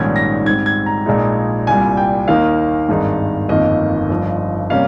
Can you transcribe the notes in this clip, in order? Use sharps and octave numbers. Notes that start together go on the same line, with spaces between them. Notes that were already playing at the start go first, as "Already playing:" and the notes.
Already playing: A#1 G#2 D#3 G3 C#4 G#6
A#6
G#2 G3 C4 G#6
G#6
A#5
A#1 A#2 G#3 D#4
C2 A#2 G3 G#5
G5
D#2 D#3 A#3 D#4 F5
G#1 G2 D#3 G#3 D#4
G1 F2 D#3 A#3 D#5
G1 G2 F3
C3 G3 A#3 C#4 F5